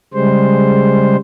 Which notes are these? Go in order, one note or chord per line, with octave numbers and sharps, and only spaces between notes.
C#3 G3 G#3 C5